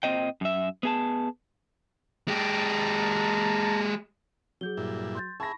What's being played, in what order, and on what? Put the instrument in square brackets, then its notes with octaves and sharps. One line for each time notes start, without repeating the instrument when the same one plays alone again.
[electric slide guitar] A#2 C4 C5 D#5 G5
F#2 E5
B3 G#4 A5
[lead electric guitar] G#3 G4 [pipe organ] A5 A#5
[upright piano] F#3 [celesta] G#4 G6 G7
[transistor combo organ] G2 A#2 E4
[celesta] C6 G6 A6
[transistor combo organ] G#4 E5 [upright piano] A5 B5 A#6 [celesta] C#6